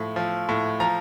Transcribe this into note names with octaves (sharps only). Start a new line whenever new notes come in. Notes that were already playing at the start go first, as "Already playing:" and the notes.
Already playing: A2 F3
F3
A2
F3 A#5